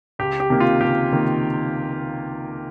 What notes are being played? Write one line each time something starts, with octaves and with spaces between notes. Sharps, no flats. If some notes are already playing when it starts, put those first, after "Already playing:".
C#2 G4
G4
C3 D#3 A#3
F4
C#2 G4
C3 D#3 A#3